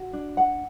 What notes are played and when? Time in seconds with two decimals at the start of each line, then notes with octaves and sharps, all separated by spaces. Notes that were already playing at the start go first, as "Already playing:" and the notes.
Already playing: F#4
0.13 D4
0.37 F#5